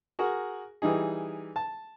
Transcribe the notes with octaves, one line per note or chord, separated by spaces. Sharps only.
F#4 G#4 A#4
E3 G3 D#4 G#4
A5